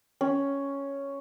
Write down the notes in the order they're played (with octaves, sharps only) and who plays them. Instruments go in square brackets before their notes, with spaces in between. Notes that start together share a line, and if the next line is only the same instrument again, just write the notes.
[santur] C#4